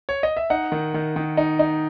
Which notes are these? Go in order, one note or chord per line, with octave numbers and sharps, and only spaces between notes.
C#5
D#5
E5
D#4 F#5
D#3
D#3
D#3
D#4
D#4